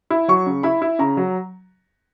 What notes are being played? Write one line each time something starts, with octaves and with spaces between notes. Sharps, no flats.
E4
F#3 C#6
C#3
E4 B5
E4
C#3 A#5
F#3